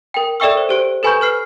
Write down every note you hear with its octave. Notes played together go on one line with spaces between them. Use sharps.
A#4 G5
A4 D5 E5 G5 C#6 E6
C5
G4 C5 D7
A4 B4 G#5 B5 C#6 G6
B4 F6 C7